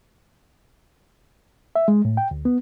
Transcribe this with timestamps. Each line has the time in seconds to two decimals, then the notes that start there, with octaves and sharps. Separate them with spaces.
1.76 E5
1.88 G#3
2.05 A2
2.17 G5
2.31 D2
2.45 B3